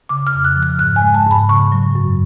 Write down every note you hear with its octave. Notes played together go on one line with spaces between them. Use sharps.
C#3 D6
F6
F2
F#6
F3
F6
G#2 F#6
G#5
G#3
A5
G#2 B5
C#3 C#6
F#3
F#2